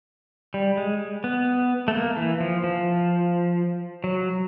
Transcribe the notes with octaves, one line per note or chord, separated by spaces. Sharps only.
G3
G#3
B3
A3
A#3
E3
F3
F3
F#3